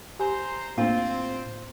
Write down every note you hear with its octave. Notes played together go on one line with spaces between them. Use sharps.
G4 C5 G#5 A#5 C6
A2 A#3 C4 D4 F4